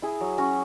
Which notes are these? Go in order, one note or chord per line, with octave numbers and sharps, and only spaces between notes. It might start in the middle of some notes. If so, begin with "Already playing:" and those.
E4 G#4
F#3
C#4 F#4